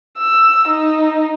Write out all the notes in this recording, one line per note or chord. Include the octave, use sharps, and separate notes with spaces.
E6
D#4